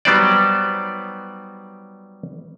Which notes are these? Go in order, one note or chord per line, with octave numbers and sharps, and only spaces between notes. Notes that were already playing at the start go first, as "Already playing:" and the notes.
F#3 G3 B3 D#4 C5 D5